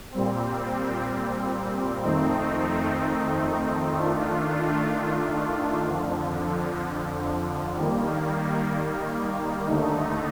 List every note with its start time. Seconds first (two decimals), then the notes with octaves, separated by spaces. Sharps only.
0.12 A#2 G3 C4
2.03 F2 D#3 A3 C4 D#4
3.94 D#3 A3 D4 F4
5.85 F2 D3 F3
7.76 D#3 G3 A#3
9.67 D#2 D3 A3 D#4